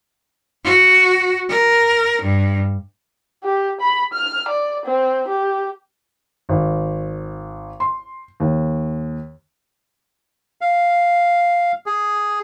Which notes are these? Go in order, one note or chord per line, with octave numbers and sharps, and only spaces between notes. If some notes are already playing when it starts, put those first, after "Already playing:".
F#4
A#4
G2
G4
B5
F6
D5
C4
G4
G#1
C6
D#2
F5
G#4